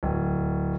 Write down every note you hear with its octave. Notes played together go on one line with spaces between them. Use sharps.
D1